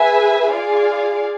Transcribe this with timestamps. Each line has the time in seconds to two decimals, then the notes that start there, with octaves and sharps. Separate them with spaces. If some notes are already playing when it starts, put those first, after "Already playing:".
Already playing: G#4 B4 E5 G#5
0.50 F4 G#4 D5 F5